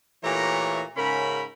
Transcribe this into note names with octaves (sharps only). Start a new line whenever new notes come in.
A#2 E3 A3 G4 C#5 A#5
G#2 C#3 C#4 A#4 B5